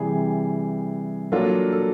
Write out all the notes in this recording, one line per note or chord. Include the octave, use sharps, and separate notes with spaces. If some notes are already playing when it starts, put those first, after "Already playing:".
Already playing: C3 E3 G3 G#4
F#3 A#3 D4 F4 A4
A4